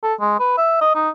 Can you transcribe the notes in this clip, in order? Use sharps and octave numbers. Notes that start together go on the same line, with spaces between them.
A4
G#3
B4
E5
D#5
D#4